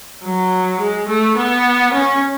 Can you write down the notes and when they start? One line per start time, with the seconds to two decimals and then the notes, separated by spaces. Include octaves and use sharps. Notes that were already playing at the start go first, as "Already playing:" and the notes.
0.24 F#3
0.80 G#3
1.08 A3
1.38 B3
1.93 C#4